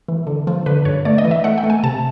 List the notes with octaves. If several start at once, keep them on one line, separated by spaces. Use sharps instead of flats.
E3
D3
F3
D3 B4
G2 C#5
A3 D5
D#5
E3
E5
A3 F#5
G5
A3
G#5
C3 A5